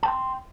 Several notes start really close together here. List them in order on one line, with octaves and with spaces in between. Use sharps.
A5 G5 C6